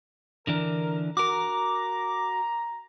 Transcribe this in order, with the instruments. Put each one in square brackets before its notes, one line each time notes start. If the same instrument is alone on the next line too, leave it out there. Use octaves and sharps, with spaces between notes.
[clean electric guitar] D3 E3 D4 [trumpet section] A#4
[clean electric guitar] F#4 A#4 [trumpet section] A#5 [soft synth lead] D6